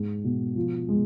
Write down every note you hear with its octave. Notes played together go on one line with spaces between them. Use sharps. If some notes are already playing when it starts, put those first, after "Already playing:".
Already playing: G#2 G#3
B2
F3
G#3